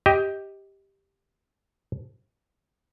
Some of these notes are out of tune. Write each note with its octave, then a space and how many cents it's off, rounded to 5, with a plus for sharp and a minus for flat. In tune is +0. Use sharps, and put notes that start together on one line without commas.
G4 +0 D#5 +20